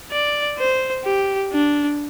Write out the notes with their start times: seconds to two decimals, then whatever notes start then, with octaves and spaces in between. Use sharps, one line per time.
0.12 D5
0.58 C5
1.05 G4
1.53 D4